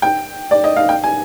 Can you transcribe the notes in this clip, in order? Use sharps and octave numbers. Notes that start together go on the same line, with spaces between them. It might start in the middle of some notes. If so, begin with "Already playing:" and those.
G5
D5
D#5
F5
G5
G#5